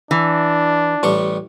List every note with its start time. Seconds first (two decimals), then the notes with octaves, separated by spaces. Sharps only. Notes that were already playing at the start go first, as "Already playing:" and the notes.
0.11 E3 D4
1.03 A1 G3 C#6